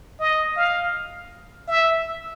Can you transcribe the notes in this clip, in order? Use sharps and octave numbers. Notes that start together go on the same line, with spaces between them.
D#5
F5
E5